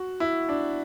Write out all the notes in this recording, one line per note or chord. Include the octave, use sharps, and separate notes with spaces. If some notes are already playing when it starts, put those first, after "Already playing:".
Already playing: F#4
E4
D4